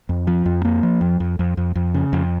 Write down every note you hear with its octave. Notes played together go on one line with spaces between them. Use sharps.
F2
F3
F2
A#3
F3
F2
F2
F2
F2
F2
C#3
F2